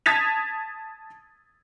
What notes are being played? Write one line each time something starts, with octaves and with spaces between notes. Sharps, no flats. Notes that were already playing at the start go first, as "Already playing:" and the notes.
A5 D#6 G#6 A6 B6 F7